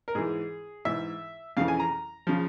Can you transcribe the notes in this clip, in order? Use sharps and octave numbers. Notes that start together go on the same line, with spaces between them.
A#4
G#2 E3 G#4
G#2 E3 E5
F2 C#3 E3 F5
G#5
A#5
C#3 F3